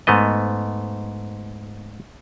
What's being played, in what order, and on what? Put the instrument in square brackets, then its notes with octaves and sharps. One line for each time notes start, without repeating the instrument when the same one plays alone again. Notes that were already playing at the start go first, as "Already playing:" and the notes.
[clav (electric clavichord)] G#2 A3 B3 D#5